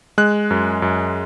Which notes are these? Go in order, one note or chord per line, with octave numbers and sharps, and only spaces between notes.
G#3 F#6
F#2
F#2